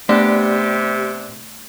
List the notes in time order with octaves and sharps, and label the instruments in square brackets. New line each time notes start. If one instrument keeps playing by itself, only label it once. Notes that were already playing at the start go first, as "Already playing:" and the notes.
[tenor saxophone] C3 [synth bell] A3 [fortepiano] B3 D4 [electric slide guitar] G4